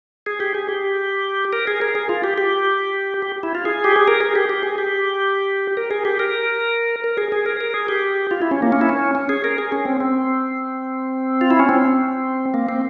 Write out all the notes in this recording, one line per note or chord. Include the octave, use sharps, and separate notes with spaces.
G#4
G4
G#4
G4
A#4
G#4
A#4
G#4
F4
G4
G4
G4
E4
F4
G#4
G4
G#4
A#4
G#4
G4
G4
G#4
G4
A#4
G#4
G4
A#4
A#4
G#4
G#4
A#4
A#4
G#4
G4
F4
E4
C#4
A#3
C#4
E4
C#4
C#4
G#4
A#4
G#4
C#4
C4
C4
F4
E4
C#4
C4
A#3
C4